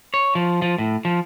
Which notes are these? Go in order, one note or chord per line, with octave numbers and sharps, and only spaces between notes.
C#5
F3
F3
A2
F3